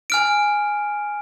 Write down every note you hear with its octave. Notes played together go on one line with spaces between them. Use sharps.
G#5 F6 D7